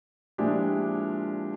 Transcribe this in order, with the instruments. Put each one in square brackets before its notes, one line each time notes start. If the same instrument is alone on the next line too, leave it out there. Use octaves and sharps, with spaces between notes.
[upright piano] A#2 F3 G#3 D4 E4 G4